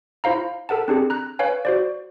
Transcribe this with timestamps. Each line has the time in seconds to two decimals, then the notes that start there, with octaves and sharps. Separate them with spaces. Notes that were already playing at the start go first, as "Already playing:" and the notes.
0.24 E4 F4 C5 F5 A#5
0.69 A4 A#4 F#5 A5
0.88 C4 D4 G4 G#4
1.10 A#5 F#6
1.39 B4 C#5 F5 G#5
1.65 F#4 C5 D5